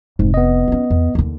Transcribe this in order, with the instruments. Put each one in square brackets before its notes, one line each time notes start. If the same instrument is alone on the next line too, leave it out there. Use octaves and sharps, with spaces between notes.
[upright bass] F1 [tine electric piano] G#2
[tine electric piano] B3 D#5
[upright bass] C#4 F4
E2
D#2 D3